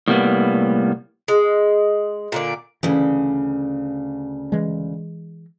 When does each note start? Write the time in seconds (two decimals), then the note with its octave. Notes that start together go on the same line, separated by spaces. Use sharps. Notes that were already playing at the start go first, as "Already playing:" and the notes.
0.08 A2 C3 G3 A#3 B3
1.28 G#3
2.32 A#2 D3 D5
2.83 D2 C#3 E3
4.52 E3 G#3